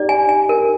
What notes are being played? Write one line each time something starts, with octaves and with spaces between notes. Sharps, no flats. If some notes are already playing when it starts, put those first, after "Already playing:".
Already playing: D#4 G4 D5
G#5
G#5
A#4